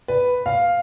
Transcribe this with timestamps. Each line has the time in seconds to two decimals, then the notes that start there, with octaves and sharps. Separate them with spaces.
0.08 B4
0.46 F5